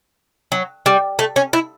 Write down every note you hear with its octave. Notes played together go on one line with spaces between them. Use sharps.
F#3
G3
A3
C#4
E4